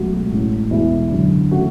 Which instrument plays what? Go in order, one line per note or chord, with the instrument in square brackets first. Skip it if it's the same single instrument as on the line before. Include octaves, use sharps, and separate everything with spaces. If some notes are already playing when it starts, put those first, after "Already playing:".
Already playing: [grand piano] C#2 B2 F#3 A3 F#4
A1 A2 G#3
E2 B2 G#3 E4
F#2 D3 F#3
C#3 E3 A3 F#4